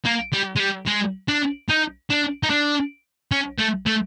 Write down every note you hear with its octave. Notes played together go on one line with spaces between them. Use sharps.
A#3
G3
G#3
G3
G#3
D4
D#4
D4
D#4
D4
C#4
A3
A3